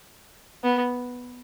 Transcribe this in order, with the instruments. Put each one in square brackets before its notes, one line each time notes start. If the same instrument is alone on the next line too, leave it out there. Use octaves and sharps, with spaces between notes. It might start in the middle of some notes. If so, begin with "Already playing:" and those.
[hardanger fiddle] B3